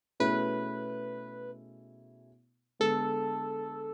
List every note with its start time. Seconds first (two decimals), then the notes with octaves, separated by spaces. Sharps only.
0.20 B2 A3 C#4 E4 G#4 B4
2.79 D3 G#3 B3 A4